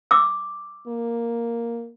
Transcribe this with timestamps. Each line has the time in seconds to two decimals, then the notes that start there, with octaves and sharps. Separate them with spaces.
0.11 D6 E6
0.87 A#3